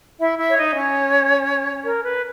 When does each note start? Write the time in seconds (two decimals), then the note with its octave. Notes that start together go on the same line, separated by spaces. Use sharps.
0.20 E4 E5
0.38 E4 E5
0.49 C#5
0.57 D#4 D#5
0.75 C#4 C#5
1.84 A#4
2.03 B4